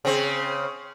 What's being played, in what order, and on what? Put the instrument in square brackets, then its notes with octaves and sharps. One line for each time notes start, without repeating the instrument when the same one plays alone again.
[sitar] C#3 C4